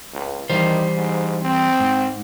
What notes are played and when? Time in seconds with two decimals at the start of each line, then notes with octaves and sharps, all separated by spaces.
0.13 C#2
0.50 D#3 E3 G3 C5
0.96 G#2
1.42 C4
1.80 G#2